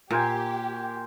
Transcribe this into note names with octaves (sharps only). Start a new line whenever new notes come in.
A#2 G4 A#4 C5 G#5